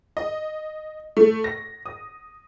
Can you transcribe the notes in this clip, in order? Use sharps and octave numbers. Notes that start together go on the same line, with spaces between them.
D#5
A3
A#6
D#6